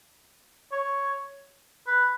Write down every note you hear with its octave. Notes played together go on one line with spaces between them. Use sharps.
C#5
B4